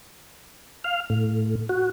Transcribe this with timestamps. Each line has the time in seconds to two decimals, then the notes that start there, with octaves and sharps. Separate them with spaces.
0.84 F5
1.10 A2
1.69 F#4